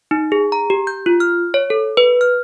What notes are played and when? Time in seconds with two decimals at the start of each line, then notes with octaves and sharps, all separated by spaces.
0.11 D#4
0.32 G#4
0.52 A#5
0.70 G4
0.87 G6
1.06 F4
1.20 F6
1.54 C#5
1.70 A4
1.97 B4
2.21 F6